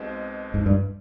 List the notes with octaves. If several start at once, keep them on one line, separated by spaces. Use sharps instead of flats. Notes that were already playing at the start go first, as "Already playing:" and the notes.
Already playing: B1 B2 G#3 C4
G#2
G2